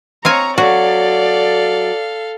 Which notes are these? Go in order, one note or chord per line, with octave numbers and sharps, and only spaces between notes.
C4 C#5 F5 G#5 A#5 C#6
F#3 F#4 A4 D5 F5